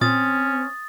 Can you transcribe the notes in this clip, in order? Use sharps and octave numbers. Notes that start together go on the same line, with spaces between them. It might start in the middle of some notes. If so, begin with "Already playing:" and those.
A#2 C4 C#4 D#6 A6